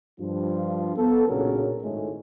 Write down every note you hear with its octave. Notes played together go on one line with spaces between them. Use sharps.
G2 F3 F4
B3 A4
B1 A#2 C#3 F#3 D4 A#4
G#1 A2 G#3